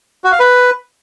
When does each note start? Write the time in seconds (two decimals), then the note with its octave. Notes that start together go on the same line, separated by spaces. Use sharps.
0.24 F#4
0.32 F5
0.40 B4